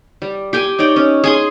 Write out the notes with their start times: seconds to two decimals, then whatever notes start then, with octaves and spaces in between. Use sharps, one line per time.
0.22 G3
0.53 G4 G5 G#5
0.79 D#4 C#5 D5 G5
0.96 C#4
1.24 G#4 G#5 C6